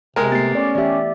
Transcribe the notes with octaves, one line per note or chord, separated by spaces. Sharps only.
C3 G#3 A#4 G5
A3 B3 G4 A6 C7
C#4 D5
E3 G4 D5 E5